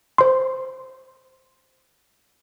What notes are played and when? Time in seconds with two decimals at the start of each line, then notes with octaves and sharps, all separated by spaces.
0.18 C5 C6